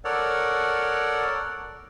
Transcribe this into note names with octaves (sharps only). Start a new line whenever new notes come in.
A4 A#4 C#5 D5 F#5